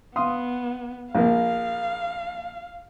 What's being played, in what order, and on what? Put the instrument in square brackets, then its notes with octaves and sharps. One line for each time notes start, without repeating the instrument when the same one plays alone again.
[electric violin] B3 [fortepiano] F5 C6 D#6
[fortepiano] A#1 A#3 [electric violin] F5